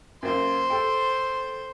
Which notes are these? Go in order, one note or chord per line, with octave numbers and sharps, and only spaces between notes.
F#2 A#3 C5
A4 G5